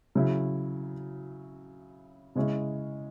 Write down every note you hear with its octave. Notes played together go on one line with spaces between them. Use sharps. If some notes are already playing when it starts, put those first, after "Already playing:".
C#3 F#3 E4
C#3 G#3 C#4 E4